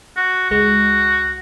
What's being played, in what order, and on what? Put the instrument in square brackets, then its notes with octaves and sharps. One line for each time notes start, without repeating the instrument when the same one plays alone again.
[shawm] F#4
[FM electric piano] C#2 G#3 [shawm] F#4